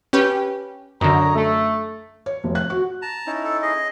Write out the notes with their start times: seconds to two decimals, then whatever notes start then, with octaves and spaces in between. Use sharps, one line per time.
0.13 C#4 G4 B4
1.01 F#2 D3 C#5 D#5 A#5
1.35 A3
2.26 C#5
2.44 F1
2.55 F#6
2.70 F#4
3.02 A5 A#5
3.26 C#4 D#4 E4
3.44 A4
3.62 G#4 D#5